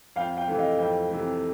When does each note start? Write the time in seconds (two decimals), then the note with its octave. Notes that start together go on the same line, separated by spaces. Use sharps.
0.16 F2 F5 G5
0.37 F5 G5
0.48 C3 E3 A3
0.58 D#5 F5
0.79 F2 F5 G5
1.11 C3 E3 A3